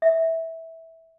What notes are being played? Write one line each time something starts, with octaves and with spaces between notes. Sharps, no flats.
E5